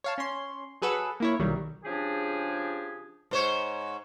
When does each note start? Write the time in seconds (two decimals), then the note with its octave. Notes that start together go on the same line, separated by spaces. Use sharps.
0.04 C#5 F5 A5
0.18 C#4 C#5 C6
0.82 F#3 G#4 A4 B4 F#5 E6
1.20 A#3 E4 C#5
1.39 B1 D#3 F#3 G3
1.85 C#3 F3 D4 G4 G#4
3.31 G#2 C5 C#5